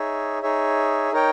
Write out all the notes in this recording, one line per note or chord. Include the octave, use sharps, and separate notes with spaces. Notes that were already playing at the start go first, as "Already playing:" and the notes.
Already playing: D#4 G#4 C#5 E5
D#4 G#4 C#5 E5
D#4 A#4 C#5 G5